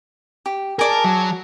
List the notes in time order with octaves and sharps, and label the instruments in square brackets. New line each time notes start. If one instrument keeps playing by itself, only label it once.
[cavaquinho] G4
[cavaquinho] G#4 D5 A5 [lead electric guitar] A#4
[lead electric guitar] F#3